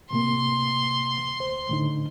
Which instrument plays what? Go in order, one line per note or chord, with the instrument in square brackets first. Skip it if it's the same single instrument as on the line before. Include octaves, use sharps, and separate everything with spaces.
[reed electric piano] A2 C3 A#3 [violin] C6
[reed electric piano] D2 C5
A2 D3 D#4